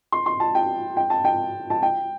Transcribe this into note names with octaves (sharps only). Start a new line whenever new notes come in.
C6
C6
A5
G5
G5
A5
G5
A5
G5